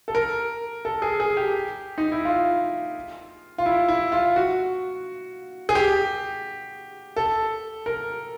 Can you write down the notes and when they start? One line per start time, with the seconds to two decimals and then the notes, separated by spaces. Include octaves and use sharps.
0.08 A4
0.15 A#4
0.85 A4
1.02 G#4
1.20 G#4
1.37 G4
1.98 D#4
2.12 E4
2.25 F4
3.58 F4
3.66 E4
3.88 E4
4.12 F4
4.36 F#4
5.69 G#4
5.75 G4
7.17 A4
7.86 A#4